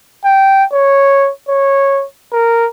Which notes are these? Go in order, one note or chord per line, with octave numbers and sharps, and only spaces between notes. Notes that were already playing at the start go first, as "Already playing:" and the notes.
G5
C#5
C#5
A#4